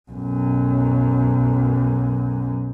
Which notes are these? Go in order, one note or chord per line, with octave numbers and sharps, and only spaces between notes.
B1 F#2